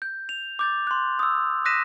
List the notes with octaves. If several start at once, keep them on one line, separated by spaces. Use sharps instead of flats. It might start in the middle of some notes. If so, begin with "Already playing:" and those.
G6
F7
D6 G6 A6
C6 F#6
D#6 E6
D#6 F#6 A#6 B6 D#7 E7